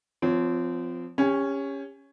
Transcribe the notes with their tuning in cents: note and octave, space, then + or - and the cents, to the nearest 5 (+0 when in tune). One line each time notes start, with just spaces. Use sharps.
F3 +0 C4 -30 C#5 +0
C#4 +0 G4 +40 C#5 +0